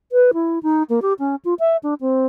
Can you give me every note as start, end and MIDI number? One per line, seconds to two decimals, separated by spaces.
0.12 0.31 71
0.34 0.59 64
0.63 0.83 63
0.90 1.00 58
1.02 1.13 67
1.19 1.36 61
1.45 1.54 65
1.59 1.77 76
1.83 1.94 62
2.01 2.27 60